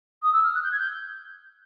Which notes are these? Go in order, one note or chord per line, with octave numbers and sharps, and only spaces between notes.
D#6
E6
F6
F#6
G6
G#6
G6